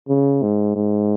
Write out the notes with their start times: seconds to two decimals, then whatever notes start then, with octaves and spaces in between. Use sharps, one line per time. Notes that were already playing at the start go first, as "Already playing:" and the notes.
0.08 C#3
0.43 G#2
0.76 G#2